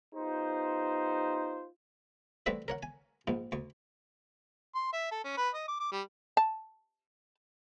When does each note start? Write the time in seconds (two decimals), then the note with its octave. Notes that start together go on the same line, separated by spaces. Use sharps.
0.15 B3 D#4 F4 G4 C5
2.46 E3 G3 A3 C4 F#4 E5
2.68 A#4 C#5 F#5
2.83 G#5
3.27 A#1 G#2
3.52 D2 C#6
4.75 C6
4.93 E5
5.12 A4
5.24 C#4
5.37 B4
5.54 D#5
5.68 D6
5.80 D6
5.92 G3
6.37 A5